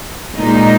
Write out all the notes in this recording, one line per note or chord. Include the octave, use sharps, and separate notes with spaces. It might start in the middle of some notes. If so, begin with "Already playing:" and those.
A#2 G#3 D#4